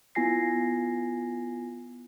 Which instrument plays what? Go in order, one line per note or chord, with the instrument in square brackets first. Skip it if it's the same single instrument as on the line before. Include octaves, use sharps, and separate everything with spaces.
[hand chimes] B3 E4 F4 G#5 A#6 C7